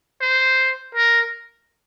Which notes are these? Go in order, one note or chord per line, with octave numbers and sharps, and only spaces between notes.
C5
A#4